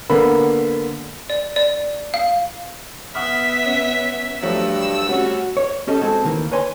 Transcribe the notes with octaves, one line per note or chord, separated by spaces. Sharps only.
D3 A#3 B3 B5
D5
D5
F5
B3 E5 F#5 D#6 F6
C#4
G2 F3 F#3 A3 E6
G3 A3 C#4 F#4
C#5
C#4 G4 A4 D#5
G#3 C4 F#4 G#4 A4
D2 D#3 E3 A#3
B4 C#5 G#5 C6